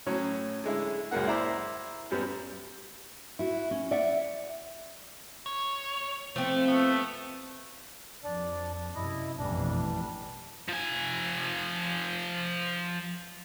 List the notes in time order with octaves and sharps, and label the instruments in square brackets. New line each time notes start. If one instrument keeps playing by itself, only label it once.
[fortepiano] A2 F#3 C#4
D3 G#3 E4
C#2 F#2 G#3 A#3 F#5
E4 C5 D5 A#5 B5
F#2 G3 B3
[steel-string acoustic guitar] E4 F#4
C#4
D5 E5 F#5
[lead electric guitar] C#5
[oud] F3 C4 [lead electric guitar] A3
[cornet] A3 [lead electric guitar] B3
[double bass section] F2 [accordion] D4 D5
[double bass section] F#2 C3 [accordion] E4 D#5
[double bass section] A1 F2 B2 [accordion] E3 G3 D4
[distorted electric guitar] F3 G#5